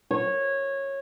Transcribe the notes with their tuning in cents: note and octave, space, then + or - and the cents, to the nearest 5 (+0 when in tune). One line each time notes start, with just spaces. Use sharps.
C#5 -15